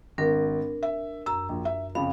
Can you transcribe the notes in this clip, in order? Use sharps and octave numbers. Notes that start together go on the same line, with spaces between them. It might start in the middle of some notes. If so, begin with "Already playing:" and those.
G#1 D4 A#4
E5
F#2 A#5 E6
A#1
E5
F2 C#3 F3 F5 B5